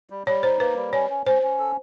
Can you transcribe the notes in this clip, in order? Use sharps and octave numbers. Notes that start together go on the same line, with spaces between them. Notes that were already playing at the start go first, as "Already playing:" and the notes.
G3
G3 C#5
D#4 C5
A#3 B4
G3
C#4 C#5
C#4
C#4 C5
C#4
A4